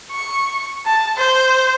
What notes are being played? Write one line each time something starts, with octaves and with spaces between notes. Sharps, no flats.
C#6
A5
C5